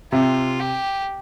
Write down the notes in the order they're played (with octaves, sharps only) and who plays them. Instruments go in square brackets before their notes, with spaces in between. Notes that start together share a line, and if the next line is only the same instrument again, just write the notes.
[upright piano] C3 [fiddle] F4
[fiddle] G4